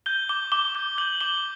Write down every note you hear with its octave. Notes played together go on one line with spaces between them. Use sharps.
G6 G7
D6 G7
D6 G7
G6 G7
G6 F#7
D6 G7